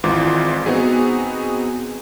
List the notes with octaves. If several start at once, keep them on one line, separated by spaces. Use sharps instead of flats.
G#1 G#2 E3 F4 D6
B3 C4 D#4 F#4 G#4